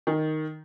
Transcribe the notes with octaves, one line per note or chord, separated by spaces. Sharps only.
D#3